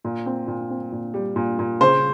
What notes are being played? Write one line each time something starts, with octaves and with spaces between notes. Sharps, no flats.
A#2
C4
A#2
C4
A#2
G3
A#2
A#2
C#3 C5